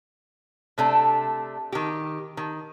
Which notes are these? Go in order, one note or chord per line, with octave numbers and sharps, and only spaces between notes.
C3 A3 D4
D#3 G4
D#3